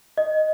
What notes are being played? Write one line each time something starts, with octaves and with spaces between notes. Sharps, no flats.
D#5